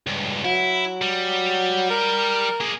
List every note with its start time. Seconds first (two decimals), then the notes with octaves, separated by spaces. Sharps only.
0.07 C#2 G2
0.45 F#3 E4
1.01 G3
1.90 A#4
2.60 A#3 G#4